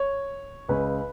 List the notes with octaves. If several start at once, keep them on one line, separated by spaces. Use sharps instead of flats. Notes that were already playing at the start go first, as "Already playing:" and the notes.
Already playing: C#5
C#2 C#3 B4